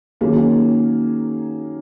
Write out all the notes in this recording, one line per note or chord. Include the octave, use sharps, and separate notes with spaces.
D#3 F#3 A#3 C#4 G#4